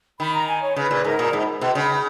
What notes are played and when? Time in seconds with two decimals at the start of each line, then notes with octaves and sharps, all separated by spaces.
0.19 D#3 B5
0.34 A#5
0.48 G#5
0.62 C#5
0.76 C#3 B4
0.91 A#2
1.04 G#2 A#4
1.19 A#2
1.33 G#2
1.61 B2
1.75 C#3